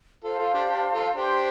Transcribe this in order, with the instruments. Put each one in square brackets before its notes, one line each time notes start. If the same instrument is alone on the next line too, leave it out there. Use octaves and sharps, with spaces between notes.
[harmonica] F4 A4 [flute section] C5 F5 A5 C6
[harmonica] F4 A4
D4 G4
D4 G4
F4 A4
[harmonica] D4 G4 [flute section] C5 G5 C6